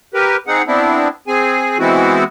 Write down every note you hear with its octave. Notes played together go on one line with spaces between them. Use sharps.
G4 A#4 B4
C4 D#4 G#4 F#5
B3 C4 D4 E4
C4 G#4 G#5
E3 G#3 B3 C4 E4 F#4